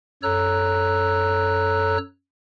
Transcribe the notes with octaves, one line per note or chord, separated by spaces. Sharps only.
F#2 A4 C#5 A#5 E6 F#6